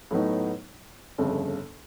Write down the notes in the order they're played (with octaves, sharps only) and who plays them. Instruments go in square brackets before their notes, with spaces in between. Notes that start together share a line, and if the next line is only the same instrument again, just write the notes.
[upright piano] A2 F#3 B3 D#4
G1 F2 C#3